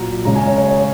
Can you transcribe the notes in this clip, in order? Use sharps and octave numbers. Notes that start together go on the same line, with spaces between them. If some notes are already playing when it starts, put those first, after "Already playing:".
Already playing: A#2 F#3 A#5
C#3 G#3 A#5
G#5
C#5
C#5
C#5